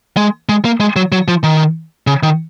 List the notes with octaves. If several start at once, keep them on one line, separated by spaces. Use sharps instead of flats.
G#3
G#3
A#3
G#3
F#3
F#3
F3
D#3
C#3
D#3